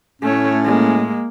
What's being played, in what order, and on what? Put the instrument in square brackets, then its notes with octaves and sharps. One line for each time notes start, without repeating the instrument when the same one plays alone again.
[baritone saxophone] A2 [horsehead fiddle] A3 C#5 [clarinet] C#4
[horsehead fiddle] G#3 A#3